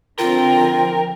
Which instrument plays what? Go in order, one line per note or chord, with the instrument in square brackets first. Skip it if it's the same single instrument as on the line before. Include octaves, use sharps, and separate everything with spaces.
[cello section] D3 F3 C4 [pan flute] F4 [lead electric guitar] A#4 [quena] G5